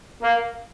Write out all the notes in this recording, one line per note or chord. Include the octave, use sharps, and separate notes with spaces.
A#3